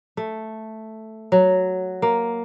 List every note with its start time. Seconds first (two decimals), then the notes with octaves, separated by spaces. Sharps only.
0.17 A3
1.32 F#3
2.02 A#3